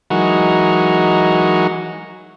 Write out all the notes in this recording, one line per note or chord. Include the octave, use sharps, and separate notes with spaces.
E3 F#3 G#3 D#4 F#4 A#4